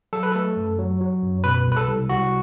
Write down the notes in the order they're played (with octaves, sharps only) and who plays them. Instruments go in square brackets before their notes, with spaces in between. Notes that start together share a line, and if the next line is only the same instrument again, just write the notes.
[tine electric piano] F#3 A4
B4
A3 A4
F#2
F#3
F#3
F#2
B2 B4
C2
B4
A4
C2
C2 F#4